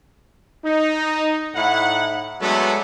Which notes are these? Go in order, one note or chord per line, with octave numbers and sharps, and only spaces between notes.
D#4
A2 D#4 E4 F#5
F#3 G#3 A3 B3 D4 A4